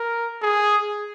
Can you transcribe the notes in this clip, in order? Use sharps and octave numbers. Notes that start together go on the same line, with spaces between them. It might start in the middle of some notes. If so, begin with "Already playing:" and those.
Already playing: A#4
G#4